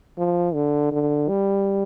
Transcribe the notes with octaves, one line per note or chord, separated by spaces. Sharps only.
F3
D3
D3
G3